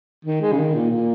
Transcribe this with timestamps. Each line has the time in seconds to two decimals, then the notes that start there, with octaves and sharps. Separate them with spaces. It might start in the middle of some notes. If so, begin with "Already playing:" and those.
0.25 D#3
0.42 G#3
0.52 C#3
0.58 D#3
0.75 A#2
0.91 A#2